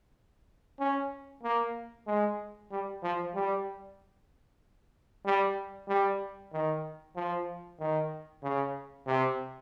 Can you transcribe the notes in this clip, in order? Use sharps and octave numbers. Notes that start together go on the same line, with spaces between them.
C#4
A#3
G#3
G3
F3
G3
G3
G3
D#3
F3
D#3
C#3
C3